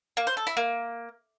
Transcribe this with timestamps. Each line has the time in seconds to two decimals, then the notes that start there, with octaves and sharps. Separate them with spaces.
0.17 A#3
0.27 C5
0.37 A4
0.47 E4
0.57 A#3